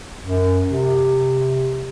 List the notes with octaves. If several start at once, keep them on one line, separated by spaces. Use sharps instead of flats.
F#2
C3